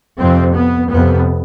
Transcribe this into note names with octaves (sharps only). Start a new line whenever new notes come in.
F2 C3 C4
B3
F2 C3 B3